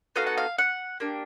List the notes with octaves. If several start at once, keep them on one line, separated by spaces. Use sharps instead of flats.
B3 D#4 F#4 A4 F5
F#5
F5
F#5
A#3 D4 G4